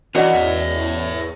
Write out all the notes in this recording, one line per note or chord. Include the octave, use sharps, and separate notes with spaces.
E3 C#4 F#4 A#4 D5 D#5 F#5
E2 C#5 E5